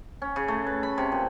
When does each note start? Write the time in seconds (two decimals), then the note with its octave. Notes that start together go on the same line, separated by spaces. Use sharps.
0.22 C#4
0.36 C#3
0.48 A3
0.67 B4
0.83 B5
0.98 C3
1.12 A#2